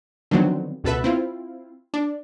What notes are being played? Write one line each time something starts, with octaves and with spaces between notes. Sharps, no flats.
D3 D#3 F3 F#3 B3 C4
C#2 B2 A4 B4 E5
C4 E4 F4
D4